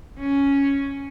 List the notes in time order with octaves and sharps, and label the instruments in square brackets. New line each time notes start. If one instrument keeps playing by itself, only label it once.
[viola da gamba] C#4